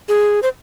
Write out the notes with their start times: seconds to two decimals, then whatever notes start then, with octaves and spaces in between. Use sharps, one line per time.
0.09 G#4
0.43 C5